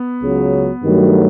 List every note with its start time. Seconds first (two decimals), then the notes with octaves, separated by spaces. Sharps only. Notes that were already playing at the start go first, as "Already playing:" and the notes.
Already playing: B3
0.22 C#2 C#3 F#3
0.83 G2 D#3 F#3 A3